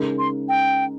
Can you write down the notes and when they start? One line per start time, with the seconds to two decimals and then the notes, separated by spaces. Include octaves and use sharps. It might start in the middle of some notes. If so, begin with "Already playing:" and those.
Already playing: C#3 G#3 D#4 A#4
0.19 C6
0.49 G5